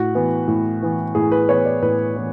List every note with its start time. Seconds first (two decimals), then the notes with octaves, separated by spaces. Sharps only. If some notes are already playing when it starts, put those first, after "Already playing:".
Already playing: A2 F#4
0.15 E3 B3
0.48 A2
0.82 E3 B3
1.15 A2 G#4
1.32 B4
1.49 E3 B3 C#5
1.65 D5
1.82 A2 B4
2.16 E3 B3